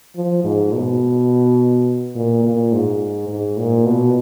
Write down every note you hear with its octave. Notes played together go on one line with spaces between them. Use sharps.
F3
G#2
B2
A#2
A#2
G#2
G#2
A#2
B2